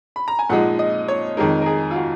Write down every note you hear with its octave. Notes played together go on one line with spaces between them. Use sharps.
B5
A#5
G#5
A#2 F3 G#3 D#4 F#5
D#5
C#5
F2 D#3 G#3 D#4 A#4
A#4
G#4
F4
F#4